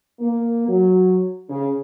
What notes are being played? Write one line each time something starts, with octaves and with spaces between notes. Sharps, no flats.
A#3
F#3
C#3